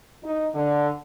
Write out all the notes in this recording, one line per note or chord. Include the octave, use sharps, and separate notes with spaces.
D#4
D3